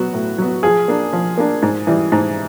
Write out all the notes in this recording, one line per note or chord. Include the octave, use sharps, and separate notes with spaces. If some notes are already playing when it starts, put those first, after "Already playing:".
Already playing: F#3 B3 F#4
A2
F#3 B3
F3 G#4
A#3 D4
F3
A#3 D4
G#2
E3 G3
G#2